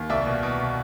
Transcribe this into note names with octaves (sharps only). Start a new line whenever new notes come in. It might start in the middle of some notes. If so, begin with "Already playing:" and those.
Already playing: D#2
C2 D5 E5
B2
B2